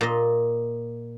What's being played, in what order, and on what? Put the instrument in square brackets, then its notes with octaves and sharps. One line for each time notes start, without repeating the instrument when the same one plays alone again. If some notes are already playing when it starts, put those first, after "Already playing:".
[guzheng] A#2 D#5